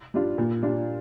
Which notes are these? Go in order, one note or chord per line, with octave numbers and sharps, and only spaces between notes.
G3 D4 F4
A#2
G3 D4 F4